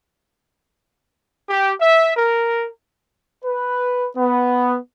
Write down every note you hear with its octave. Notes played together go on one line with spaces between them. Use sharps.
G4
E5
A#4
B4
B3